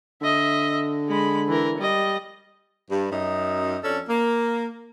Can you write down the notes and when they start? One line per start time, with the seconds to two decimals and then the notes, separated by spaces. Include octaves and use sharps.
0.22 D3 D#5 E5
1.08 G#3 B5
1.48 E3 A#4
1.77 G3 D#5
2.91 G2
3.11 F#2 D#4
3.84 F2 C#4 D4 A4
4.09 A#3